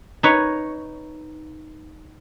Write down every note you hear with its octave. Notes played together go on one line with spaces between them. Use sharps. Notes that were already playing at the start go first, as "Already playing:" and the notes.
D#4 B4 C#5